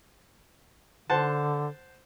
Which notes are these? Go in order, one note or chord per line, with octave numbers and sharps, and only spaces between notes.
D3 C5 F#5 A5